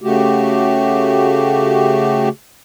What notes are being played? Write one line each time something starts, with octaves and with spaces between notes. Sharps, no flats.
C#3 A3 F#4 G4